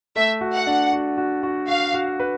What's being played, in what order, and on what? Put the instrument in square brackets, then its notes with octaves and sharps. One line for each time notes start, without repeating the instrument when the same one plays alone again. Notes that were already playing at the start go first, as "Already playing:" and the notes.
[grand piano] A3 [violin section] E5
[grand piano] F#4
[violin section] F#5
[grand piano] D4
F#4
F#4
F#4
[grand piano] F#4 [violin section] F5
[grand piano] F#4
B4